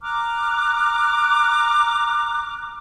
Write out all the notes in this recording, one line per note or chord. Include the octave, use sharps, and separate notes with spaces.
A#5 D6 F6 F#6